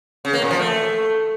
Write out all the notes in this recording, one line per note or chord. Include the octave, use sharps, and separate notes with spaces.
C#3
A#3
A#2
F3
A3